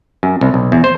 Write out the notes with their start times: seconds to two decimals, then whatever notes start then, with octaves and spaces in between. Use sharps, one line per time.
0.23 F#2
0.41 C2
0.54 B1
0.72 E2
0.84 C5